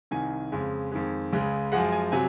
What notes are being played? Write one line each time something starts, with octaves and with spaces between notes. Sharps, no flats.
C2 C3 D#3 G#5
F2 C#3 G#3
F2 D#3 G#3
C#2 C#3 G#3
F#2 F3 G#3 F#5
G#5
C3 F#3 G#5